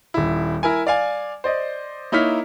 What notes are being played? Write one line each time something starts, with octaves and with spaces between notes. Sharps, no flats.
D#1 E4
E4 A#4 G#5
D5 F5 G#5
C5 D5 D#5
A#3 D#4 E4 C#5 F6 B6